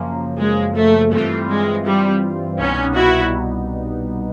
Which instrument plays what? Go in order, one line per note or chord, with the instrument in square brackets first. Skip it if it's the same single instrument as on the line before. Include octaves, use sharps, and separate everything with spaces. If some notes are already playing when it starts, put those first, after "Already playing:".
Already playing: [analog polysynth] F#2 C#3 F3 A#3
[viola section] G#3
A3
[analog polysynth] G2 E3 G3 C4 F4 [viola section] A3
[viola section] G#3
G3
[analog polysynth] C2 B2 G3 B3 D#4 [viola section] C#4
[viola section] E4 F#4